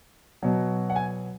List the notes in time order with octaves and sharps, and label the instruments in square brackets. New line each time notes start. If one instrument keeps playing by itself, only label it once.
[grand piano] B2 F#3
F#5
G#5